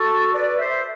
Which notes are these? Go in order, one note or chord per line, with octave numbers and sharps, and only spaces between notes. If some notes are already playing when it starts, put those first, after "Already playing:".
Already playing: F#4 A4
B4 D5
C5 E5